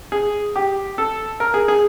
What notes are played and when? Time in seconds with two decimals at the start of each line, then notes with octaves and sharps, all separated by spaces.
0.12 G#4
0.56 G4
0.98 A4
1.40 A#4
1.54 G#4
1.68 G#4